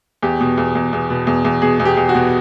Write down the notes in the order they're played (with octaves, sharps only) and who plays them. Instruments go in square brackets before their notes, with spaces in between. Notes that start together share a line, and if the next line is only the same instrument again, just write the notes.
[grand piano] E2 G4
B2
E2
E2
E2
B2
E2
E2
B2 G#4
E2
G4
E2
F#4
B2